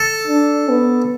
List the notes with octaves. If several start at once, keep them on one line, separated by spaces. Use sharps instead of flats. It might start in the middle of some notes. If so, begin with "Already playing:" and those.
Already playing: A4
D4
B3